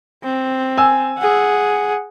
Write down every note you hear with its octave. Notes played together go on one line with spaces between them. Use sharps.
C4
G#5 E6
G#4 F#5